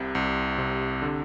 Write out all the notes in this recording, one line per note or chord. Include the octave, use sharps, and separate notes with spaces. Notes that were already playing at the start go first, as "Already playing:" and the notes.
Already playing: C2 C3
C2
C3
D3